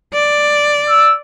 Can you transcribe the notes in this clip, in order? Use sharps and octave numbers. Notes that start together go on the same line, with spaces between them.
D5
E6